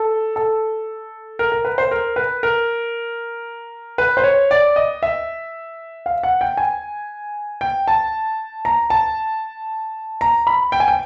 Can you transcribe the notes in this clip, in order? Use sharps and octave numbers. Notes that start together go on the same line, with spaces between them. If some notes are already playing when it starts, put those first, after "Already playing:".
Already playing: A4
A4
A#4
A#4
B4
C5
A#4
B4
A#4
B4
C5
C#5
D5
D#5
E5
F5
F#5
G5
G#5
G5
A5
A#5
A5
A#5
B5
G5
G#5
G5